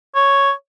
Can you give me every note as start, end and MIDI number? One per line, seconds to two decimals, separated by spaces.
0.16 0.52 73